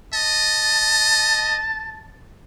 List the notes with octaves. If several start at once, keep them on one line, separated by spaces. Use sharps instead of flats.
D#5 A5